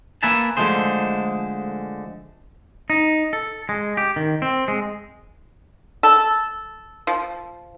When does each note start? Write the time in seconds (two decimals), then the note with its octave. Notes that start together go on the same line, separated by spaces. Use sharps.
0.23 A#3 A#4 B4 E5 G#5 A5
0.57 D3 F3 G#3 A3 G#4 C5
2.90 D#4
3.33 A4
3.69 G#3
3.97 G4
4.16 D#3
4.42 C4
4.68 G#3
6.03 A4
7.07 F3